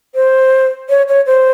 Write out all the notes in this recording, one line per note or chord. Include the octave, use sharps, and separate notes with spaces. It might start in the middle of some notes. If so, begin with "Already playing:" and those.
C5
C#5
C#5
C5